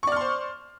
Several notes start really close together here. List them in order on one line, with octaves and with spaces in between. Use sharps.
C#6 D5 F6 C6 C5